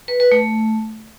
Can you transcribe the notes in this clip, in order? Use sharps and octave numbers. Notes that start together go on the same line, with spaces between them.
B4
B4
A3